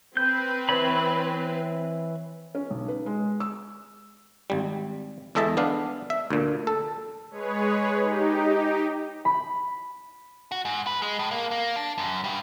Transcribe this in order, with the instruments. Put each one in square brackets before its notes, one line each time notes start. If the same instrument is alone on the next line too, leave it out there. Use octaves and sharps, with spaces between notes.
[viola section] C4 B4 [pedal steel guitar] G6
[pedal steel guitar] E3 C#5 B5
[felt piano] C#4
B1
B4
G#3
E6
[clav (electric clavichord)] G#1 G3
E2 G#3 A4 D#5 E5 A5
B3 D4 F5
E5
D2 A#2
A4
[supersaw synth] G#3 G#4 B4 C#5
D#4 G4
[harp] B5
[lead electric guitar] F#4
G#2
B4
G#3
A2
A#3
A#3
D4
F#2
G2